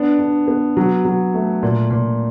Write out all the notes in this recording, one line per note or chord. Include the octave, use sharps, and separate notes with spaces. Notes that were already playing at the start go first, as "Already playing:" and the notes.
Already playing: B3 D4
D4
B3
F#3
F#3
A3
A#2
A#2